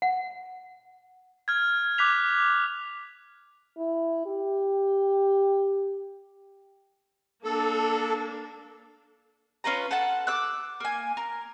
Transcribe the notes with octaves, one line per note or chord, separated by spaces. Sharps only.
F#5
F6 G#6
D6 F#6 B6 F7
E4
G4
A#3 D4 A4
C#4 F4 B4 A#5
A4 F#5 A5
D6 E6 F#6
A#3 G#5
A#4